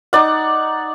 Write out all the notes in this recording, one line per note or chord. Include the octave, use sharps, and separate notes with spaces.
D#4 D5 F#5